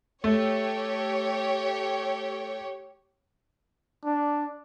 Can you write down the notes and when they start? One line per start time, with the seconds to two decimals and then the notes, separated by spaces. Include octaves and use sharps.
0.24 A3 G4 C#5
4.05 D4